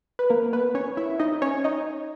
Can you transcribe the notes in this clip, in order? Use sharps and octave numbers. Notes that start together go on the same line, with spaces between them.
B4
A#3 A#4
B3 B4
C#4 C#5
E4 E5
D#4 D#5
C#4 C#5
D#4 D#5